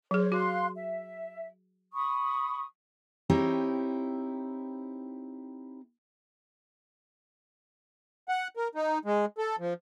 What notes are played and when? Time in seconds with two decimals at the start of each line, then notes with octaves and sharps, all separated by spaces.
0.11 F#3 G#4 C5 C#5
0.32 F#4 F5 C6 F#6
0.76 E5
1.93 B5 C#6 D#6
3.30 C4 D#4 E4 G4 C#5
8.29 F#5
8.57 A#4
8.75 D#4
9.05 G#3
9.38 A4
9.59 F3